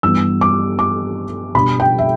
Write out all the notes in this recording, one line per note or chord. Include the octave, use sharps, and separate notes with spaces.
G2 E3 G3 B3 D4 E6
D6
D6
B2 G3 D4 B5
G5
E5